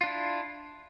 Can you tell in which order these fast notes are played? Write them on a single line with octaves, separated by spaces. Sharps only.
F4 D4 E4